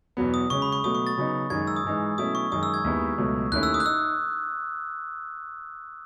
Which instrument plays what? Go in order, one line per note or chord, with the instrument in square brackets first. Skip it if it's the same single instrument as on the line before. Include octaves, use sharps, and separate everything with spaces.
[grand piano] E2 B2 F#3 B3
[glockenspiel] D#6
[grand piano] C#3 G#3 C#4 [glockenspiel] C#6
[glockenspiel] B5
C#6
[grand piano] B2 F#3 A3 [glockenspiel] D#6
[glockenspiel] C#6
A6
[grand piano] C#3 F#3 B3 D#4
[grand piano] F#2 D#3 G#3 D#4 [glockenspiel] G#6
[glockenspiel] E6
D#6
[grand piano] G#2 E3 G#3 D#4
[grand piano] B2 F#3 A3 C#4 E4 [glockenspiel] D#6
[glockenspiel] C#6
[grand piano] F#2 D#3 G#3 [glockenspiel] D#6
[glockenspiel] E6
G#6
[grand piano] D#2 D#3 G#3 B3 E4
C#2 B2 F#3 A3
[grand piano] D#2 D#3 A3 C#4 E4 [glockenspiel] F#6
[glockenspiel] E6
D#6
F#6
[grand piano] D#4 [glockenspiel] E6